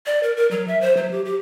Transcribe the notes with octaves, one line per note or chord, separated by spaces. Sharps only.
D5
A#4
A#4
F#3
E5
C5
F#3
G4
G4